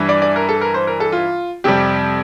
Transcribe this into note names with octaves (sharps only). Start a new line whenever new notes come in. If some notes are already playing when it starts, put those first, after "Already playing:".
Already playing: G2 E3 G3
D5
D5
A#4
A4
A#4
C5
A#4
A4
F4
F2 C3 G3 G4